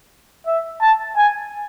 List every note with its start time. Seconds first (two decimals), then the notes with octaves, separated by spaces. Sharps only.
0.47 E5
0.82 A5
1.17 G#5